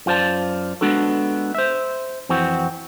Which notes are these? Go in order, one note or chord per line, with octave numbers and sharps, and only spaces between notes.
F#2 F4 C5 D5 A5
G#3 B3 D4 F#4 A4
C5 E5
F2 E3 C4 F#4